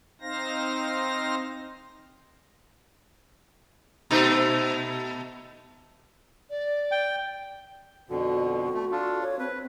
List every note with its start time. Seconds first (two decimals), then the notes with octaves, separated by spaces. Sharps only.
0.21 C4 D#4 C5 F5 A#6
4.11 B2 A3 D#4
6.50 D5
6.92 G5
8.09 F2 B2 D3 F#4
8.74 A3
8.92 D4 F4 A4
9.22 C#5
9.39 C4 B4